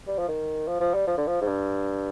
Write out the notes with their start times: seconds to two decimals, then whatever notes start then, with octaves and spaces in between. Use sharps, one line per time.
0.07 G3
0.18 F3
0.28 D#3
0.67 F3
0.80 F3
0.94 G3
1.07 F3
1.17 D3
1.27 F3
1.41 G#2
1.47 G2